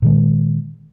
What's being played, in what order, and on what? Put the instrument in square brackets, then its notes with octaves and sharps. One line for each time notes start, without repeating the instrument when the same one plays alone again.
[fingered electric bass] A#2 D#3 G#3